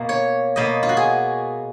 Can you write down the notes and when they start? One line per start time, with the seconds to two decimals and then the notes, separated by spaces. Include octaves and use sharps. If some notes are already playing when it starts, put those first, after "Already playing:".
Already playing: B2 A#3
0.09 C#5
0.56 B2 A#3 D#5
0.83 F4
0.89 F#4
0.97 G#4